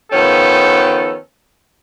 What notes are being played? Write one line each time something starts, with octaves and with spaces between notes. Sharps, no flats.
D#3 F3 B3 C#4 A4 G5